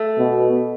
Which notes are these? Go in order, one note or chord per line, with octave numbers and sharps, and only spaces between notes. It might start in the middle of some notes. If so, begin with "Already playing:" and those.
Already playing: A3
B2